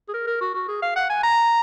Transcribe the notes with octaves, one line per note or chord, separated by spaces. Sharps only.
G#4
A#4
A#4
F#4
F#4
G#4
F5
F#5
G#5
A#5